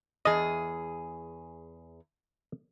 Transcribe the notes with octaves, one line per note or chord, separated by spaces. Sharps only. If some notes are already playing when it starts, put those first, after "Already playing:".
E2 G#4 D#5